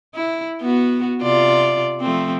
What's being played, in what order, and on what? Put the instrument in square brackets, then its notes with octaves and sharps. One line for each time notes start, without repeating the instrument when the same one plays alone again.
[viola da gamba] E4
B3 F#4
C3 F4 D5
F3 A3 C4